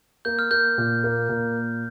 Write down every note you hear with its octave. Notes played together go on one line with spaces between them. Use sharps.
A#3 G6
F6
A#3 G6
A#2
A#3
A#2